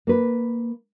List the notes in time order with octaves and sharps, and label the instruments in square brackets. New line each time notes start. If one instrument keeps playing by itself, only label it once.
[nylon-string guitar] A#3 B4